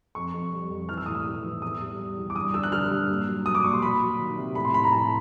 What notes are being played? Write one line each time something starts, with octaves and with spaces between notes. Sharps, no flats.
F2 C#6
F2
G3
F2
E3 F6
E6
A2 D#6
E6
A2
E3
E2 D#6
G3
G3
E2
D6
G2 D#6
D3 E6
F#6
D3 F6
G2
A#2
F#3
F#3 D#6
D6
A#2 C#6
C6
F#3 B5
F#3
D#3
C3
A2 B5
C6
A2 B5
A#5
A2 A5